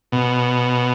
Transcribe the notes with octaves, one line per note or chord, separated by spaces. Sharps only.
B2